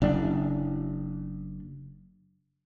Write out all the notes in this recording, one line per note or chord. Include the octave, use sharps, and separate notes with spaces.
F#1 D4